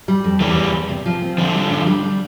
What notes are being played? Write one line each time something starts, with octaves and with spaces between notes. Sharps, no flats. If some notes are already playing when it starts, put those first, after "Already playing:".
G3
F2
E2 E3 G3
E2
E2
C3
F3
C4
D3 F3 D4
G3
D4
G3
D4